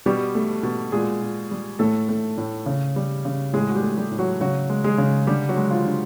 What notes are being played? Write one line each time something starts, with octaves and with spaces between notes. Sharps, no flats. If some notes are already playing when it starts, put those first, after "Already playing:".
B2 G3 G4
A3
B2
A#2 G#3 G#4
A#2
G3
A2 A3 A4
A3
A2
C#3
G3
C#3
A2 G#3 G#4
F#4
G3 G4
A3
G3 G4
A2
F#3 F#4
C#3 F#3 F#4
G#3
G#3 G#4
C#3
D3 G3 G4
F#3 F#4
G#3
F3 F4
D3